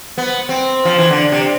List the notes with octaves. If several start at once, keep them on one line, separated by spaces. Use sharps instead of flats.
B3
C4
F3
E3
D3
C3